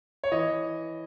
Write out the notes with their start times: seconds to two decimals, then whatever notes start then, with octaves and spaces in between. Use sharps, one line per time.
0.24 C#5
0.32 E3 D#5